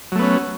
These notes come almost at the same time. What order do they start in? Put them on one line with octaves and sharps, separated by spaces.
F#3 A3 B3 C#4